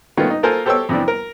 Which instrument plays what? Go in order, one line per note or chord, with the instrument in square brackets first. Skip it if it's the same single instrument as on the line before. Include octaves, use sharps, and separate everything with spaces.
[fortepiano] D#3 A3 B3 C#4 F4
D#4
A#3 F4 A4 A#4 C5 G#5
G4 A4 C5 C#5 G5 E6
F2 C3 E3 D4
A#4